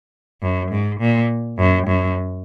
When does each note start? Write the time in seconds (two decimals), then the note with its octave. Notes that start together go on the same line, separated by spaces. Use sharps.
0.42 F#2
0.71 G#2
1.00 A#2
1.58 F#2
1.87 F#2